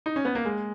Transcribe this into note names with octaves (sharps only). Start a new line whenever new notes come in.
D#4
C#4
B3
A#3
G#3